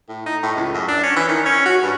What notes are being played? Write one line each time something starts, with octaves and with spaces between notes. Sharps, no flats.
A2
D#4
A2
C#2
F#2
D4
C#4
E3
D#3
C#4
F#4
G2